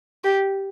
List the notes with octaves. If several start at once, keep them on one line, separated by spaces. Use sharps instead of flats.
G4